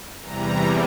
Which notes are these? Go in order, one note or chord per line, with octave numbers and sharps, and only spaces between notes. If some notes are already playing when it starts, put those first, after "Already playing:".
E2 C3 E3 G3 A#5